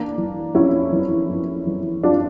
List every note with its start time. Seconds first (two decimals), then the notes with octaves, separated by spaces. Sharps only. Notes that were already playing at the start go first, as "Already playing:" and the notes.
Already playing: E3 A#3 D4
0.18 E3
0.55 F2 C#4 E4
0.93 E3
1.29 F2
1.67 E3
2.03 F2 D4 F4